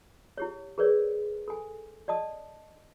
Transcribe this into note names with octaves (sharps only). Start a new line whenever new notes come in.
E4 G4 C#5
G#4 A#4 B4 C#5 D5
A4 G#5
D5 D#5 A5 D#6